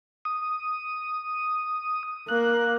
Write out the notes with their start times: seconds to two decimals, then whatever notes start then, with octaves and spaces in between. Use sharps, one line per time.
0.25 D#6
2.29 A#3 F#6